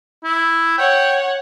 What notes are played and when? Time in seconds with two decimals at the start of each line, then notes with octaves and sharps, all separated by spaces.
0.24 E4
0.78 C#5 F#5 G5